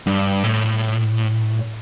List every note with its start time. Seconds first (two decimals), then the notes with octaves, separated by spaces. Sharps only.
0.07 G2
0.44 A2